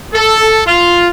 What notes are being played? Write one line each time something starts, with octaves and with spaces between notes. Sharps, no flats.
A4
F4